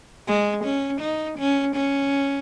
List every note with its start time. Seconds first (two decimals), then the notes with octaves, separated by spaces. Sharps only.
0.28 G#3
0.64 C#4
1.01 D#4
1.39 C#4
1.76 C#4